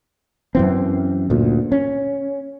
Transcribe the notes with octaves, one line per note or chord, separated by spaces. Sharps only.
F#2 E3 C4
D2 A#2
C#4